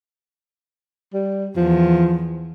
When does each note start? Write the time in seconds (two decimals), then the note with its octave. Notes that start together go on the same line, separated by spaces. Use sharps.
1.14 G3
1.56 E2 F3